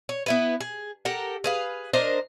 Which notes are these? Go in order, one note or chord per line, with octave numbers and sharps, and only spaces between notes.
C#5
B3 E4 B4
G#4
G4 A4 A#4 F#5
G#4 B4 F5
D4 A#4 C5 D#5